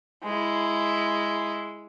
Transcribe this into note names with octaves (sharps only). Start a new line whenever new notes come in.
G#3 E4